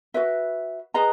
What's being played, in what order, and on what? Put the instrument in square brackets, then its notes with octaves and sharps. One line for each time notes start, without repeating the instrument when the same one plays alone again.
[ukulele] F#4 B4 E5
G#4 B4 D#5 A#5